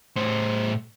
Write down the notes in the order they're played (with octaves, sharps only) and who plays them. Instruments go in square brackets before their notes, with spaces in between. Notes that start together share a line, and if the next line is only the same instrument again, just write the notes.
[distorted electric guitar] A2 C5